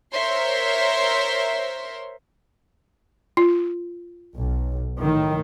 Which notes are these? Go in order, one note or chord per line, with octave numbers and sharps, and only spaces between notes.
A#4 C5 C#5 E5 C6
F4
B1
A2 D#3